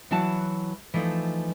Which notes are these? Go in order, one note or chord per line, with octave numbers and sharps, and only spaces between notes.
E3 F#3 E4 F#5 A5
E3 F3 A3 D#4